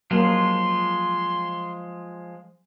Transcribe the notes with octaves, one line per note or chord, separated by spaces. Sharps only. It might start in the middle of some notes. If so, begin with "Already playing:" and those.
F3 F#3 G#3 A#3 F4 C6